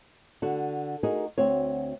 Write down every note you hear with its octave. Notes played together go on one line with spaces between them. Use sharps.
D3 F#4
D#4 F#4 G#4 A#4
D2 C4 F#4 C#5